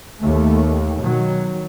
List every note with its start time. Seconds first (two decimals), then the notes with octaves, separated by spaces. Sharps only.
0.22 D#2 A3
1.01 B2 D#3 F#3